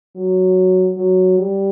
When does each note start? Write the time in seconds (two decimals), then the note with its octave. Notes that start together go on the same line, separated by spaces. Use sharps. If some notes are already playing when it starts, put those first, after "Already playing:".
0.16 F#3
0.97 F#3
1.38 G3